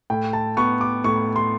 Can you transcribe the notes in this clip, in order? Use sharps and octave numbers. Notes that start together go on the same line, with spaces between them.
A2 G5
A5
B3 C#6
D6
A2 C#6
C6